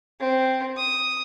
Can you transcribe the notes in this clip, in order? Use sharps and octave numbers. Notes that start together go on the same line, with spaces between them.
C4
D#6